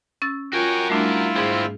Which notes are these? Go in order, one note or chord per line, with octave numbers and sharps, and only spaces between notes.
C#4 E6 A6
F4 F#4 A#4 C#5 G5 G#5
G3 A3 D4 E4 F4
G#2 G#3 C4 G#4